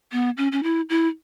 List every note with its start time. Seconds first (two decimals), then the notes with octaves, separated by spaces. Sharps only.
0.12 B3
0.37 C#4
0.52 C#4
0.63 E4
0.90 E4